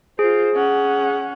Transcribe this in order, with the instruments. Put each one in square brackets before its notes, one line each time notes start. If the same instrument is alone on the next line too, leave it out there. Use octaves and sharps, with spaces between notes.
[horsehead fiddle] F4 C5 [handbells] G#4
[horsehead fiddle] C#4 F#5